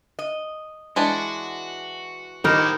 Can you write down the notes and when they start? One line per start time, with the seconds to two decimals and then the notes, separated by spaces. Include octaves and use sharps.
0.19 D#5
0.96 E3 G#3 D4 F#4
2.44 A2 D#3 A#3 D#4 G4 A#4 C5